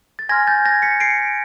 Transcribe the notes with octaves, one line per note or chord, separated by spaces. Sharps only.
A6
G#5 C6 F6 G#6 A#6
G6 A6
G#6 A#6
B6 C#7
C7 D7